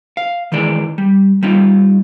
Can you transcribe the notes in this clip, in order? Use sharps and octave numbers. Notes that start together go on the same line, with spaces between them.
F5
D#3 E3 G#3 D5
G3
G3 C4 D#4 F4